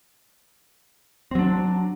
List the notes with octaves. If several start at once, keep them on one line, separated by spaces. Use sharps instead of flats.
F#3 C4 D4